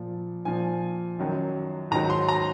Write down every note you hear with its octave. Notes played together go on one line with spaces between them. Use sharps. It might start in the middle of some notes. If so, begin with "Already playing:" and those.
Already playing: A#2 F3
A#2 F3 G#5
F#2 D#3 F#3
G#2 D#3 F#3 A#5
C6
A#5